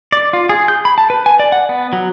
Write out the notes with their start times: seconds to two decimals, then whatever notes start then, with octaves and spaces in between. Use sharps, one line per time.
0.12 D5
0.33 F4
0.49 G#4
0.68 G6
0.85 B5
0.98 A5
1.10 B4
1.26 G#5
1.39 D5
1.52 F#5
1.69 B3
1.93 F#3